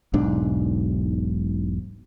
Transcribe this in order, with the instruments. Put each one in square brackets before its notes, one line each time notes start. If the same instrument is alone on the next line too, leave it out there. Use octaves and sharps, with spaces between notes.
[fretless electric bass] E1 B1 G#2 D4